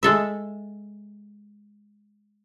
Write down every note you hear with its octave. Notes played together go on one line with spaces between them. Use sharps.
G#3 A4 E5